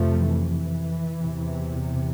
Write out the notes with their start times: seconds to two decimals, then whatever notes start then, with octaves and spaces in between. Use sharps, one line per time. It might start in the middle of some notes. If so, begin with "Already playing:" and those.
Already playing: F2 C3 F3 A3
0.29 E3
1.18 E2 C3